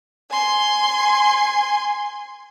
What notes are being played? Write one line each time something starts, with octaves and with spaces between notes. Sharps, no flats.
G#5 C6